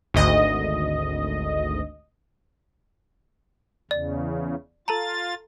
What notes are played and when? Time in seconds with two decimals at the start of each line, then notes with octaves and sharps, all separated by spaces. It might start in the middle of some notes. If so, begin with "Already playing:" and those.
0.14 G#1 D2 D#5
3.91 E2 C#3 D5
4.88 F4 A4 A5 A#5 A6